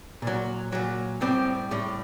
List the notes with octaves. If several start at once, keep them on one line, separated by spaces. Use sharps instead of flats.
A#2 F#3
A#2 F#3
A2 G3 C4
A2 G3